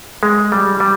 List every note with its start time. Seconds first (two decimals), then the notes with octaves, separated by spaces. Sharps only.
0.23 G#3
0.52 G3
0.80 G3